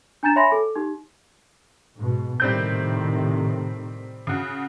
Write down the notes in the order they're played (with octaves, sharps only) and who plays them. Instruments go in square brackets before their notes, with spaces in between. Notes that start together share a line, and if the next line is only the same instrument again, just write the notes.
[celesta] D4 G#5 A#5 G6 A6 E7
C#5 E5 G#5 B5 C6 A#6
A4
D#4 G4
[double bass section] G#2 B2
[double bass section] A2 C3 D#3 [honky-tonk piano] G3 C4 G6
[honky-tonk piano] C#3 F#4